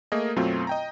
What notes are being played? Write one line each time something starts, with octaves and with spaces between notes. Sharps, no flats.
A3 A#3 G#4 A#4 D#5
F#2 B2 F#3 A3 C4 F4
D#5 G5 A#5